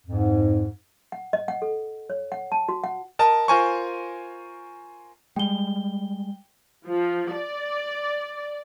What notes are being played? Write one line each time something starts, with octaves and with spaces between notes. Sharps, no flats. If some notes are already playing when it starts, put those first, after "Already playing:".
F2 G#2
F#5
D#5
F#5
A4
C#5
F#5
A5
F#4
F#5
A#4 D#5 A5
F4 A#4 C5 G#5 A#5 C#6
G3 G#3 G5 G7
F3
D5